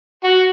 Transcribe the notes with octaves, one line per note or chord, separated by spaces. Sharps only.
F#4